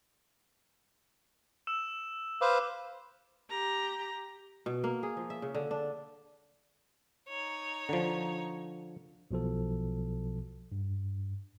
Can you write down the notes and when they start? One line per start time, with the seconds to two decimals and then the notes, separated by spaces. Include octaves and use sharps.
1.67 E6 E7
2.41 B4 C5 F5 D6
3.50 G4 A#5
4.66 B2
4.84 A#3
5.03 G#4
5.17 F3
5.30 E5
5.42 C#3
5.54 D3
5.71 D4
7.29 D#4 C#5
7.89 D3 F3
9.31 B1 B2 F3 A4
10.72 G2